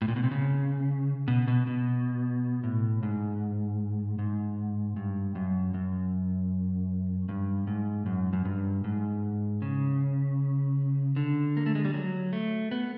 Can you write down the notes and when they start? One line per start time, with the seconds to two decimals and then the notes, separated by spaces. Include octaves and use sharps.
0.02 A2
0.08 A#2
0.16 B2
0.23 C3
0.31 C#3
1.28 B2
1.48 B2
1.67 B2
2.64 A2
3.03 G#2
4.19 G#2
4.96 G2
5.35 F#2
5.74 F#2
7.29 G2
7.67 G#2
8.06 F#2
8.33 F#2
8.45 G2
8.84 G#2
9.62 C#3
11.16 D3
11.57 A#3
11.66 A3
11.75 G#3
11.85 G3
11.94 F#3
12.33 A3
12.71 B3